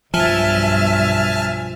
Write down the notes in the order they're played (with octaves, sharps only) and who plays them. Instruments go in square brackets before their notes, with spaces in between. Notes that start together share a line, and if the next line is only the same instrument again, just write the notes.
[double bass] B1 G2 [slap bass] F3 [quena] E5 [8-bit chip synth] G#5 A5 F6